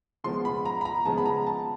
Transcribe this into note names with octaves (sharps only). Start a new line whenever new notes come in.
C#3 F3 G#3 B3 C6
B5
A#5
B5
A#5
C#3 F3 G#3 B3 A5
B5
A#5
A5